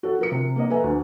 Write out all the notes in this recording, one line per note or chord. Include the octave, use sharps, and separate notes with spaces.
F#4 A4
F3 A#4 C#7
C3
A#3 A#4 D#5
A4 B4 E5 G#5 A#5
D2